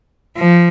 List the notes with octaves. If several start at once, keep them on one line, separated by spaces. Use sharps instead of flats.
F3